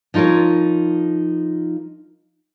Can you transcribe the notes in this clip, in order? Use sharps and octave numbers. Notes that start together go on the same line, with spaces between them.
F3 D#4 F4 A#4 C#5